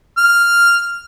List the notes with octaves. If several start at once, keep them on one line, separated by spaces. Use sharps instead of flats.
F6